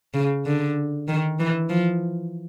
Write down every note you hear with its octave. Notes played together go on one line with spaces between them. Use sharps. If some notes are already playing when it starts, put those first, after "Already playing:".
C#3
D3
D#3
E3
F3